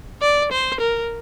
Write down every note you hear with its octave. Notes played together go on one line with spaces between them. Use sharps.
D5
C5
A#4